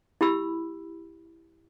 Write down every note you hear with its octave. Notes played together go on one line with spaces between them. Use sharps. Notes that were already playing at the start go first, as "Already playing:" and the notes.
E4 G4 B5 E6